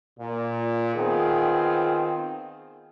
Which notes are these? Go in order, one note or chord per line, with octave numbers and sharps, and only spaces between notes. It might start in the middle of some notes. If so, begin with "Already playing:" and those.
A#2
D#3 B3 C4 F4 G#4